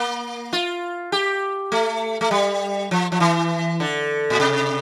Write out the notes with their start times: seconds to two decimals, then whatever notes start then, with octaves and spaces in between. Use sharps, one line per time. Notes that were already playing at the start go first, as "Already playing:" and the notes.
Already playing: A#3
0.53 F4
1.12 G4
1.72 A3
2.21 A3
2.31 G3
2.91 F3
3.12 F3
3.20 E3
3.80 D3
4.30 A#2
4.40 C3